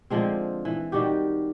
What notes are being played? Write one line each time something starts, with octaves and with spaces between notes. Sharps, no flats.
D3 F3 G#3 C4
E3
D#3 G3 F#4 G4